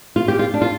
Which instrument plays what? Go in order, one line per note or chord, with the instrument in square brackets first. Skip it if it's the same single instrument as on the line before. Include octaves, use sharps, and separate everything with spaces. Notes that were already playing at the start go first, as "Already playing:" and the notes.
[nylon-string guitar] F4
G4
F4
D4
F4